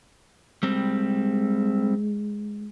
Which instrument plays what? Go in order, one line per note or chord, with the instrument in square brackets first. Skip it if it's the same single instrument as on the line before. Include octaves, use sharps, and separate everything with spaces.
[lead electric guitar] G3 C4 [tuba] G#3